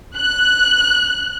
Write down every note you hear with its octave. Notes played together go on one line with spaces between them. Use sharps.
F#6